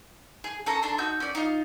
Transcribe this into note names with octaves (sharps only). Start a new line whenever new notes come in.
G#4
C#4 A4 A#5
D4 A4 C6
D#4 F#4 E6 G6
C#4 D5
D#4 F4